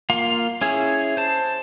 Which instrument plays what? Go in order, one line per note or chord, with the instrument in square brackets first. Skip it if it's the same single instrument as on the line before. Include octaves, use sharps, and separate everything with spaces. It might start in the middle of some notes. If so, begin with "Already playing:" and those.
[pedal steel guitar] A#3 F4 F5
C#4 E4 G#4
C5 A5